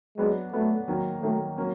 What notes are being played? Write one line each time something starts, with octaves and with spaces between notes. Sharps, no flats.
F#3 G#3 B3 D4
F#3 A3 B3 D4
D#3 F#3 A#3
D#3 F#3 A3 A#3
F#3 A#3 C#4